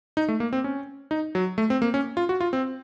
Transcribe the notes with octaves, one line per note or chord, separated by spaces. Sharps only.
D#4
A3
A#3
C4
C#4
D#4
F#3
A3
C4
A#3
C#4
F4
F#4
F4
C4